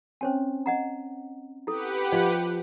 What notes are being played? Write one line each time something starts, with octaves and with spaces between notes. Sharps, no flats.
C4 C#4 C5 C#5 G5 G#5
D#5 F#5 A#5
E4 G4 A4 B4 F#5
F3 D#5 F5 C6